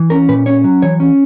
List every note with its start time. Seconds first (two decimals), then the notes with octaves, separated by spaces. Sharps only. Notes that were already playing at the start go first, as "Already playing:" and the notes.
Already playing: E3
0.10 C#4 A#4
0.29 A#2 B4
0.46 C#4 C#5
0.64 F#3
0.82 E3 C#5
1.00 C#4